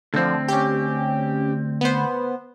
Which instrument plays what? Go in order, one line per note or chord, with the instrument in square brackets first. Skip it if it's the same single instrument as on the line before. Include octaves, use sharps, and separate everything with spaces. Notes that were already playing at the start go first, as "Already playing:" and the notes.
[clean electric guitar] D2 C4 [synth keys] D3 F3
[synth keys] C#4 G4
B3 C5